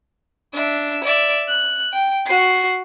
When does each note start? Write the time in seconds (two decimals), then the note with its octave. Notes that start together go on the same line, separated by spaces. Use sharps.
0.54 D4 E5
1.04 D5 E5
1.48 F#6
1.93 G5
2.26 F#4 C7